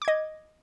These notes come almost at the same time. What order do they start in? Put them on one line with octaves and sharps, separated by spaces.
D6 G#6 D#5